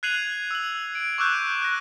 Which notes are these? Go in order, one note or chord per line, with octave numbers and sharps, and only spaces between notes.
F#6 G#6 C7 D#7 F7 F#7
E6 F#7
D7
C#6 D6 E6 F#6 G6
F#6 A#6